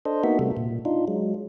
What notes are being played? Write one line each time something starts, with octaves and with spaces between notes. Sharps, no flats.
D4 A4 C5 D#5
A#3 B3 D#4 F#4 E5
C3 G3 A3
A#2
D4 D#4 F4
F#3 G#3